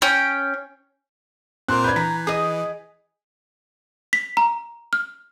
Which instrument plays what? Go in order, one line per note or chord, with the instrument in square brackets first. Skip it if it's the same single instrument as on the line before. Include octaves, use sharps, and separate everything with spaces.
[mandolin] C#4 G5
[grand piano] A#2 [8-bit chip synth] C4 A#4 [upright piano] C6 F#6
[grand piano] D4 B4 [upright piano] G6 G#6
[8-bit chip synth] E3 [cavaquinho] A#5 [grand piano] B6
[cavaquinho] G#4 D#5 [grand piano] D#6
[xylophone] B6
A#5
F6